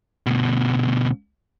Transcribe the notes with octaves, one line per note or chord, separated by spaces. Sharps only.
D2 B2